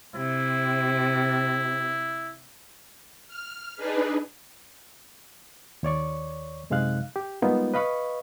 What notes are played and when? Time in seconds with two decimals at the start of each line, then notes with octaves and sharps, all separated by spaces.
0.15 C3 E4
3.28 F6
3.76 D4 D#4 G#4 B4
5.83 D#2 C#5 D5 C#6
6.70 F#2 C3 G#3 D#4 F5 F#6
7.16 G4
7.42 G3 G#3 A#3 B3 D#4 F4
7.74 B4 D#5 F5 B5 C#6